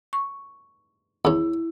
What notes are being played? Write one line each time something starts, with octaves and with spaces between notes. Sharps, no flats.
C#6
E2 C#4 E4